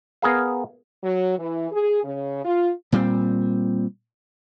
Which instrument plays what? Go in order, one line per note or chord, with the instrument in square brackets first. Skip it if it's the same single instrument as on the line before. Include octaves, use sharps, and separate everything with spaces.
[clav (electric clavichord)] B3 G#4 A#4 F5
[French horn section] F#3
E3
G#4
C#3
F4
[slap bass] A#2 G3 A3 C4